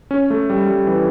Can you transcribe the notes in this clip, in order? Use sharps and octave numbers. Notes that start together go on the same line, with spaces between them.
C#4
A3
G3
G3
E3